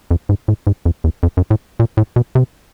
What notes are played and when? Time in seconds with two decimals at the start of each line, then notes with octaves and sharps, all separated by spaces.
0.11 F2
0.29 G#2
0.48 A2
0.67 G#2
0.85 F2
1.04 E2
1.23 F2
1.37 F#2
1.50 A2
1.80 A#2
1.97 A2
2.16 B2
2.35 C3